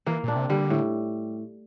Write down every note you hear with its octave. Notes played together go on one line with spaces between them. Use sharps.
E3 A#3
A#2 D4
C3
D3 G3
A2